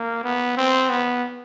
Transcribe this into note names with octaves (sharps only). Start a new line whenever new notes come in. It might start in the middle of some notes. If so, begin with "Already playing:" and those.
Already playing: A#3
B3
C4
B3